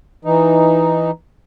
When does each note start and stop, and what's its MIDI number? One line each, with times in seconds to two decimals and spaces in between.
0.25 1.11 52
0.25 1.11 63